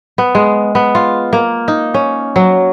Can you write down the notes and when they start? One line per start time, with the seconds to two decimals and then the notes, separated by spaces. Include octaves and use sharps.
0.18 B3
0.35 G#3
0.75 B3
0.95 F4
1.33 A#3
1.68 D#4
1.94 C#4
2.36 F#3